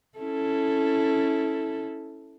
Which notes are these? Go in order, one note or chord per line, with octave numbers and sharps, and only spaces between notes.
C#4 E4 A4